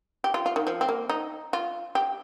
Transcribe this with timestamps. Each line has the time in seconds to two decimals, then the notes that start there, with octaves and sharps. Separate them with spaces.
0.24 G4
0.34 F4
0.46 F4
0.56 D#3
0.67 F3
0.81 C4
0.89 A#3
1.09 D#4
1.53 F4
1.95 G4